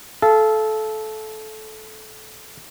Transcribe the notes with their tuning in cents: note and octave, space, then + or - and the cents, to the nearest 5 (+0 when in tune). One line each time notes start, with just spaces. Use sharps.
A4 -20 F5 -35